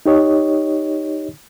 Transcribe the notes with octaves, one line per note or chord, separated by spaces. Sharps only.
D#4 G4 C#5 D#5